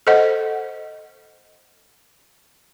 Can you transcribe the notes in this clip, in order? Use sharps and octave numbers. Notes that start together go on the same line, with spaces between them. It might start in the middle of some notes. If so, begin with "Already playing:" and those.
A4 C5 D#5 F#5